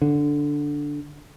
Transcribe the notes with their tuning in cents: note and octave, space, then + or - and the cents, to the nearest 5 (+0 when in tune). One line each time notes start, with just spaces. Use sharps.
D3 -5